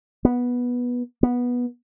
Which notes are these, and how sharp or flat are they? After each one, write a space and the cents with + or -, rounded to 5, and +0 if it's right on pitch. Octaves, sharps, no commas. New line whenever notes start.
B3 -10
B3 -15